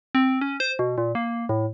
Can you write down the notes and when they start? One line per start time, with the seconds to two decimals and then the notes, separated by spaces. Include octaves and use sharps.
0.15 C4
0.41 C#4
0.60 C5
0.79 B2
0.98 A#2
1.15 A#3
1.49 A2